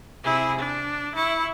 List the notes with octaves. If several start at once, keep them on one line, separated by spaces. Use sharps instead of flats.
C3 E4 G#4
D4
E4 C#6